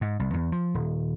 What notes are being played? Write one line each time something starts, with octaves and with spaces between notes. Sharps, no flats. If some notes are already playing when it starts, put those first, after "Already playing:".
G#2
C2
E2
F3
D#1